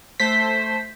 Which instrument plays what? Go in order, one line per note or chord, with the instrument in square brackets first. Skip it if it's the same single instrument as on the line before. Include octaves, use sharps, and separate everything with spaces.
[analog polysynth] A3 C5 [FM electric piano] B6